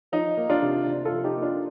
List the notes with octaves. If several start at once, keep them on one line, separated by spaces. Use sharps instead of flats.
F3 D#4
A#3
D4 F4
C3
C3
F4 A4
F3
D#4 G4
A#3
D4 F4